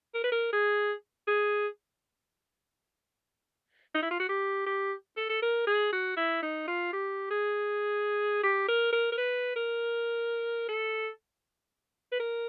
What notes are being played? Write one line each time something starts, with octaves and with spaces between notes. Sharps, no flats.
A#4
B4
A#4
G#4
G#4
D#4
E4
F4
F#4
G4
G4
A4
A4
A#4
G#4
F#4
E4
D#4
F4
G4
G#4
G4
A#4
A#4
A#4
B4
A#4
A4
B4
A#4